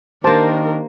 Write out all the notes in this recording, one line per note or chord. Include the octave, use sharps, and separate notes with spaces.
D#3 A#3 D4 G4 A#4 C5 A5 D6